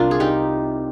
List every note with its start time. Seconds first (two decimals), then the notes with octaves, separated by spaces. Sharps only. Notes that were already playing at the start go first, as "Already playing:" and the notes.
Already playing: C2 C3 D4 F4 A#4
0.11 G#4
0.20 D#4 G4